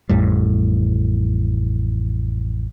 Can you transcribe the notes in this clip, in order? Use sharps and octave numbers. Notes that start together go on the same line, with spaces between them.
A1 F2 A2 G3